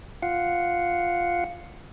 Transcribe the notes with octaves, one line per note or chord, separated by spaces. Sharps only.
F4 F5 F#5